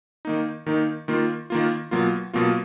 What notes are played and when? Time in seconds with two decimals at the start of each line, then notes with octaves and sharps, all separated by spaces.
0.25 D#3 A#3 D#4
0.66 D#3 A#3 D#4
1.08 D#3 A#3 F4
1.50 D#3 A#3 F4
1.91 B2 F#3 A#3 F4
2.34 B2 F#3 A#3 F4